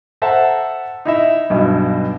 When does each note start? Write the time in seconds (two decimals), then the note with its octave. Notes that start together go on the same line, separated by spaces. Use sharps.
0.22 A4 C5 E5 F#5 A5 A#5
1.05 D#4 E4 E5
1.50 B1 G2 B2